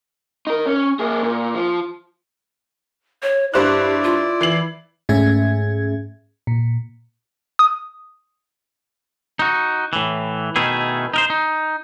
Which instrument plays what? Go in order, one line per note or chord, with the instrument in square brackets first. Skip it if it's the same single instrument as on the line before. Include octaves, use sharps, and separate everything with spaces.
[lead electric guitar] D#4 A#4
C#4
A#3 G#4
A#2
F3
[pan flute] C#5
[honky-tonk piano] G2 C5 F#6 [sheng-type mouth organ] E4 D5 [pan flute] G4
[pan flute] F4
[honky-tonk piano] E3 C7 F#7
[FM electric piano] G#2 A3 C#4 G#4 E5 G#6
A#2
[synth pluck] D#6
[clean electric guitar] D#4 F#4
A2 E3
B2 D#3 A3 E4 G#4
D#4 A#4 C5
D#4